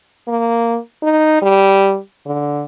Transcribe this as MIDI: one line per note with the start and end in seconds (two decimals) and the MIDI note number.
0.28 0.78 58
1.03 1.42 63
1.42 1.97 55
2.26 2.64 50